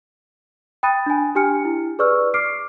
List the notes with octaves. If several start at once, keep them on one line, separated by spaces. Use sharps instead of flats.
G5 B5 D#6 F#6 A6 D#7
D4 G#5
D4 G4 G5 G#5 F6 C#7
E4
G#4 B4 D5 C#6 E6 F6
D6 F6 C7 D7